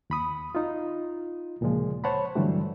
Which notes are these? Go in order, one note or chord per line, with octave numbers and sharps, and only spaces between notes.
D#2 B5 D#6
D#4 F4
D2 A#2 C#3 F3 G#3
C5 C#5 F#5 A5 B5
G2 D3 E3 F#3 G3 A3